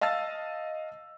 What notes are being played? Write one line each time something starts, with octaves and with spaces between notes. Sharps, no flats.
D#5 F5 A5 E6 A6